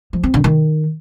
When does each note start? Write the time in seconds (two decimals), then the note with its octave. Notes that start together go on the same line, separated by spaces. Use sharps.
0.13 F3
0.23 C4
0.34 D3
0.44 D#3